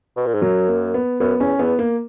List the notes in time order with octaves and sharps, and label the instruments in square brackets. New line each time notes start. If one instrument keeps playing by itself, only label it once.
[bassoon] B2
A#2
G#2
[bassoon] F#2 [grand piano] F#3
[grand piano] A#3
B3
[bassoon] F#2 [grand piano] B3
[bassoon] E2 [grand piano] C#4
[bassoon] E2 [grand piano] B3
[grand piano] A#3